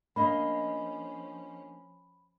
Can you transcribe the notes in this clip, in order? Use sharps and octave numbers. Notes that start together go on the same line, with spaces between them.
F3 A#3 C#4 D4 D#5 F5 B5